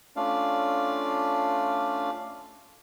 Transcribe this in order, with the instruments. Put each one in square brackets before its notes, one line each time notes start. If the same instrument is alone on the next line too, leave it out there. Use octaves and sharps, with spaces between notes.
[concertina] A3 C#4 D4 F4 D5 F5